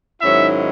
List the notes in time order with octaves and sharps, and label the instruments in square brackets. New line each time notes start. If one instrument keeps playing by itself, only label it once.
[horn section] G#2 D#3 F#3 C#4 E4 E5